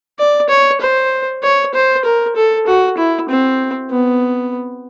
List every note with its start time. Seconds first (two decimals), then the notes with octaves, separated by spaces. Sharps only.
0.19 D5
0.49 C#5
0.81 C5
1.43 C#5
1.74 C5
2.05 A#4
2.36 A4
2.67 F#4
2.98 E4
3.29 C4
3.90 B3